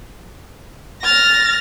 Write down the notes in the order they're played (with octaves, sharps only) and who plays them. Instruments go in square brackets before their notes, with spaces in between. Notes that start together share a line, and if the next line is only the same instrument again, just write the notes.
[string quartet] F6 A6 A#6